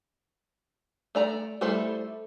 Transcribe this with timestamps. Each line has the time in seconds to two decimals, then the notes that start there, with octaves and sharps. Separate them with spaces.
1.15 A3 D5 A#5
1.61 G3 A3 E4 A4 C5